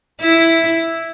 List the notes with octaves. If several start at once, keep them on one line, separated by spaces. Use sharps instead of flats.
E4